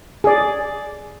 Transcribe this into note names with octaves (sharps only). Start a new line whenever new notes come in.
G#4 D5